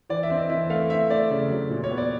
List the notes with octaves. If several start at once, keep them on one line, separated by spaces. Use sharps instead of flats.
E3 D5
E5
C4
D#5
E3 E5
A3 F5
C4 E5
A3 D5
C#3
F#3
A#2
C#5
B3
D5